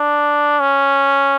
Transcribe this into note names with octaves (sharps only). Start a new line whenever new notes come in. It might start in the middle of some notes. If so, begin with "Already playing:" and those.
Already playing: D4
C#4